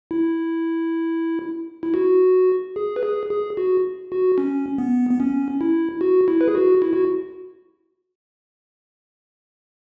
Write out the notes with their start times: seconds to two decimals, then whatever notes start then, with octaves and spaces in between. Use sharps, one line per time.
0.11 E4
1.83 E4
1.94 F#4
2.76 G#4
2.96 B4
3.03 G#4
3.30 G#4
3.57 F#4
4.12 F#4
4.38 C#4
4.78 B3
5.11 B3
5.20 C#4
5.61 E4
6.01 F#4
6.28 E4
6.41 B4
6.48 G#4
6.55 F#4
6.82 E4
6.93 F#4